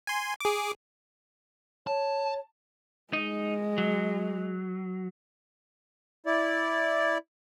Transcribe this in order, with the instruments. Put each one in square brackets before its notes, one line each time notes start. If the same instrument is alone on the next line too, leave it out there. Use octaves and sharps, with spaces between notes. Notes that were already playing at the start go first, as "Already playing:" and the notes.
[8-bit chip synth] G#5 C6
G#4 D6
[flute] C#5 [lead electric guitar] A5
[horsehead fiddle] G#3 [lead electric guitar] D#4
[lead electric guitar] F#3
[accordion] E4 D5